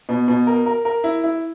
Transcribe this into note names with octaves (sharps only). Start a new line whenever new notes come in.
B2
B2
A#4
A#4
A#4
E4
E4